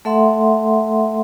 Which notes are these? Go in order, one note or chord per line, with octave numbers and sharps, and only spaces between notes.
A3 A4 E5 F#5 C6